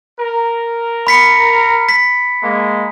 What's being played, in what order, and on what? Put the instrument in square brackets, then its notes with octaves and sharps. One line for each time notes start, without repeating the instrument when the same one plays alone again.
[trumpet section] A#4
[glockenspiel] B5 B6 C#7
B6
[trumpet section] G#3 A#3